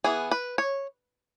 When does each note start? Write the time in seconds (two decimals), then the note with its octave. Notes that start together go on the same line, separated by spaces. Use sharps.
0.04 E3 B3 G#4
0.31 B4
0.58 C#5